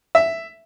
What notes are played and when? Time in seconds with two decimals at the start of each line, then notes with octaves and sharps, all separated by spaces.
0.15 E5